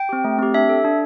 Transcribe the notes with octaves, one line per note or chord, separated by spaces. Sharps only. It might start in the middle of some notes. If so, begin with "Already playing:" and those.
Already playing: G5
C4 G4
A3
C4 G4
D4 E5
A4
D4